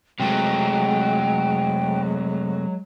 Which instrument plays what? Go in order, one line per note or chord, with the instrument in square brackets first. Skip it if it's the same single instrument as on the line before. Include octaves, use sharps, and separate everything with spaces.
[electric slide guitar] C3 A3 C4 [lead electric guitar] F#3 [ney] G#3 [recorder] G5